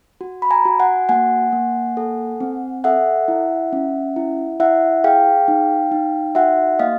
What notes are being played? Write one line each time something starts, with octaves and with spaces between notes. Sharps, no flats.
F#4
B5
G#5 A#5
F#4
F#5 G#5
A#3 F#5 G#5
A#3
A4
C4
A4 E5 F#5
E4
C#4
E4
E4 E5 F#5
G#4 F5 G5
D#4
D#4
F#4 E5 F#5
A#3 D#5 F5